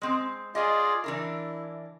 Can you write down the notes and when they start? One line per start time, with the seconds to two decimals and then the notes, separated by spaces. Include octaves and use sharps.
0.02 G#3 C4
0.55 F4 G#4 D5 D#5 G#5
1.04 E3 D4 E4 A#4